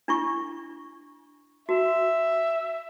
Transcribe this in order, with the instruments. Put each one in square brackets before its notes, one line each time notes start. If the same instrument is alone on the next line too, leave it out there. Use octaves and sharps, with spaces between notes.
[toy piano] D4 E4 C#6
[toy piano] F#4 [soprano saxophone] E5